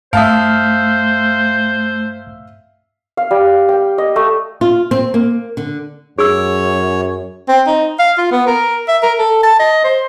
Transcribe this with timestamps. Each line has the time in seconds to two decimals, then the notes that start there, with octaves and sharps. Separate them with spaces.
0.13 G2 A3 C5 E5 F5 A5 D#6
3.17 F5
3.31 G3
3.69 G5
3.98 D#5
4.16 A3
4.61 F4
4.91 C4
5.14 A#3
5.57 D3
6.19 F#2 G#4 C#5 E6
7.49 C4
7.67 D#4
7.99 F5
8.18 F4
8.31 B3
8.47 A#4
8.88 E5
9.03 A#4
9.19 A4
9.43 A5
9.59 D#5
9.84 C5